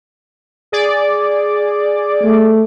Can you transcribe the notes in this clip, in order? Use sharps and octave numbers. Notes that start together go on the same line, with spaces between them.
G#4 D5
A3